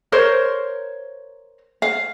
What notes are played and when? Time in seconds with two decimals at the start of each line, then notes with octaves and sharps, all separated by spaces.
0.12 A#4 C5 C#5
1.82 F5